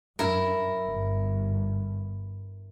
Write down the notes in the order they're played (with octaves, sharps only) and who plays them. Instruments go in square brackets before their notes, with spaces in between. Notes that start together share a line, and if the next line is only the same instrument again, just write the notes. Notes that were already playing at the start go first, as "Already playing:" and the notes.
[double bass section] F#2 [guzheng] E4 A#4
[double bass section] G1 G2